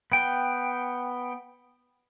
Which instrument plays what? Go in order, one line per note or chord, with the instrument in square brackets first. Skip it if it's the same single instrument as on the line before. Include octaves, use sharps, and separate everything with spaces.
[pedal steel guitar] B3 G5